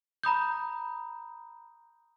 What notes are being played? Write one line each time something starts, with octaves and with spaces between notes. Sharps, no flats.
A#5 B5 D#6 G6